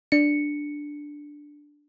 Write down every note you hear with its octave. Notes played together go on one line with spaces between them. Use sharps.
D4 C#7